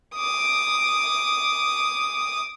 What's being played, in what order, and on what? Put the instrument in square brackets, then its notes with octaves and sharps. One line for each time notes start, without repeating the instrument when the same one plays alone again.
[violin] D6 D#6